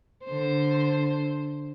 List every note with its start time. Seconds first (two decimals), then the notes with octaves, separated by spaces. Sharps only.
0.25 D3 C5